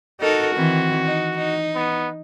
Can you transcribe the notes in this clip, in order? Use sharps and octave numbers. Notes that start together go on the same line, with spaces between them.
D#4 F#4 A4 A#4
D#3 E3 C4
D#4
D#4
B3